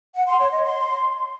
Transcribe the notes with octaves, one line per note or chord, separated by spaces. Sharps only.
F#5
C6
C#5
D#5
C6